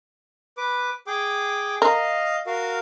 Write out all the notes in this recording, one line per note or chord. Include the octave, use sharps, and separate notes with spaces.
B4 D6
G#4 G5 D6
A#4 D#5 F5
F#4 A#4 F5